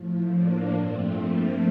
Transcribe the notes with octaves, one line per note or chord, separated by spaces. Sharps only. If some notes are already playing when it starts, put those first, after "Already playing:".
Already playing: A2 F3
A#3 D4
G2 F3 A3 C4
A#3